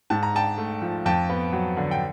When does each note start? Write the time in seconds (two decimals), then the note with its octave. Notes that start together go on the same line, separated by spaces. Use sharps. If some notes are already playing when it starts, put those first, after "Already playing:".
0.10 G#2 A5
0.23 A#5
0.34 D4 G5 A5
0.58 A3
0.82 F3
1.06 F2 G5 A5
1.30 B3
1.53 F#3
1.77 D3
1.91 G5